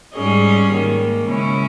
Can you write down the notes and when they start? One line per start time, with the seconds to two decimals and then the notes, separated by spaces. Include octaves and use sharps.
0.14 G#2 G3 C#4 G#4 D#5
0.70 G#2 D#3 A#3
1.27 C#3 G#3 C#4 E4